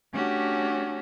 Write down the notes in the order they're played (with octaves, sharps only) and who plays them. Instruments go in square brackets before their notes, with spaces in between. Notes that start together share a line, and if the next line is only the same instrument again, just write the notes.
[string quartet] A3 C#4 D4 F#4 G4